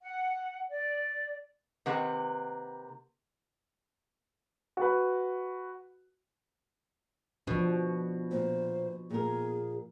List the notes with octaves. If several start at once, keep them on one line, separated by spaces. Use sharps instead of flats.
F#5
D5
C3 D#3 A#3 B4 F#5
F#4 B4
B2 F3 D4
A#2 C5
A#2 G#4 A#4